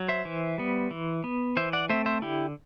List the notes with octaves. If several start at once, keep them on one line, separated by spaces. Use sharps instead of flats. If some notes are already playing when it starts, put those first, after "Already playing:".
Already playing: F#3
C5 E5
E3
G3 B3
E3
B3
E3 C5 E5
D5 F#5
A3 C4 C5 E5
C5 E5
D3 E4 G4